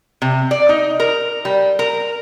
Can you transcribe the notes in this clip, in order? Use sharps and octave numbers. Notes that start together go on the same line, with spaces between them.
C3
D5
D#4
A#4
G3
A#4